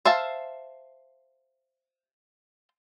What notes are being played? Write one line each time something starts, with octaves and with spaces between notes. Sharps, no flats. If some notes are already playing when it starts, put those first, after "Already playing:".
C5 E5 F5 A5